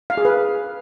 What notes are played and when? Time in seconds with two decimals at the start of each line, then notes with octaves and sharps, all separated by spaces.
0.10 F5
0.17 G#4
0.25 B4